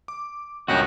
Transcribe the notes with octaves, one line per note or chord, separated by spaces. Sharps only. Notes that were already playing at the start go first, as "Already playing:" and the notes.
D6
C#2 G2 A#2 C#4 F#4 D#5 G5 F#6